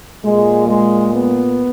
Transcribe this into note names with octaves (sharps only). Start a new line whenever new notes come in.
A#2 G#3
G#3
B3